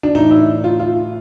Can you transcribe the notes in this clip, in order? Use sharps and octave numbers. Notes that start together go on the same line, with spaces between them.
D4
A2 E3 D#4
E4
F4
F4